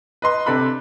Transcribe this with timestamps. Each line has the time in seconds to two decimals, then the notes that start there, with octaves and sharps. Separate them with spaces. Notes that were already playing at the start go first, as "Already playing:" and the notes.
0.22 B4 D#5 C6
0.46 C3 D4 A4 B5 F#6